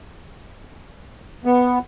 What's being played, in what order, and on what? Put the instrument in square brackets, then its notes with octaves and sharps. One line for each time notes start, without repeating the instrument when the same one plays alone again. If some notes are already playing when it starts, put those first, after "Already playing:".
[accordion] B3